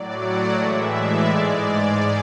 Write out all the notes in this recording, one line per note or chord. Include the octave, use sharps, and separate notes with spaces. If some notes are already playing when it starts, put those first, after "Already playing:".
Already playing: A2 F#3 D5
F#5
A2 E3 G#3 E5
D5
G#2 G#3 D5